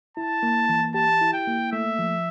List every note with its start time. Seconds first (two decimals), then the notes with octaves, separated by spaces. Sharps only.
0.17 E4 A5
0.43 A#3
0.69 E3
0.94 G4 A5
1.21 E4
1.33 G5
1.47 A#3
1.73 A3 E5
1.99 F3